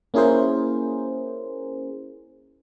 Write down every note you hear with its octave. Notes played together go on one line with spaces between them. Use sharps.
A#3 C#4 E4 G#4 A#4 C5